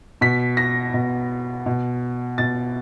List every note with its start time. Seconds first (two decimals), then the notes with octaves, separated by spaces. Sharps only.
0.21 B2 B6
0.57 A#6
0.94 B2
1.66 B2
2.38 B2 A6